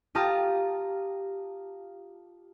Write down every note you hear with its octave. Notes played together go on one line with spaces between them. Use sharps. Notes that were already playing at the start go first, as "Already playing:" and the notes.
F4 G4 A5 A#5 D#6 F6